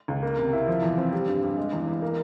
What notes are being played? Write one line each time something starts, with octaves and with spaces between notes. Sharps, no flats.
C#2
A#3
C3
E4
F3
E2
C4
G3
G2
G2
G#3
E2
E2
A#3